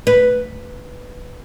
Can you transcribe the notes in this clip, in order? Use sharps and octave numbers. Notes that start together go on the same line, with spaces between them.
B4